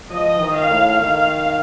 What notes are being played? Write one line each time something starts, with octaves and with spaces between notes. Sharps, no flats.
F3 D#5
D#3
F5
A2
D#3 F5